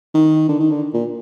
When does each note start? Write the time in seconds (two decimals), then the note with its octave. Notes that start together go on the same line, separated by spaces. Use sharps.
0.14 D#3
0.49 D3
0.60 D#3
0.71 D3
0.94 A#2